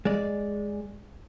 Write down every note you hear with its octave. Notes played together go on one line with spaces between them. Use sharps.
G#3 D5